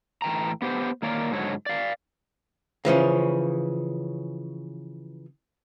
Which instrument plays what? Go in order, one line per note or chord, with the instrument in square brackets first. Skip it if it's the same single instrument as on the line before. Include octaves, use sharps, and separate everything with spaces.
[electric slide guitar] A2 E3 G5 A#5
B3 G4 C5
D#3 A#3 C#5 D5
G#2 D3 F#3 C#5
D5 F5
[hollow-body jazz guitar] C#3 E3 F3 C#4